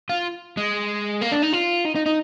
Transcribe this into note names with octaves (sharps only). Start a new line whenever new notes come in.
F4
G#3
A#3
D4
D#4
F4
D#4
D#4
D#4